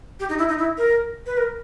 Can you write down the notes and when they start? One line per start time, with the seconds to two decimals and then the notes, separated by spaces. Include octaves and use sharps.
0.20 G4
0.29 D#4
0.39 E4
0.49 D#4
0.58 E4
0.78 A#4
1.26 B4
1.37 A#4